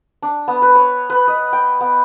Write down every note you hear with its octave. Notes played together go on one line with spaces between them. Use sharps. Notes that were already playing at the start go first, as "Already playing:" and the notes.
D4
B3
B4
C#5
B4
D#5
G5
B3